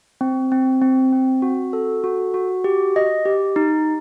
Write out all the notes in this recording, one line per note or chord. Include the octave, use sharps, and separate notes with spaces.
C4
C4
C4
C4
F#4
A4
F#4
F#4
G4
D#5
G4
D#4